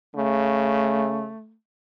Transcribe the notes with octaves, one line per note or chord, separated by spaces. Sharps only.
C#3 A3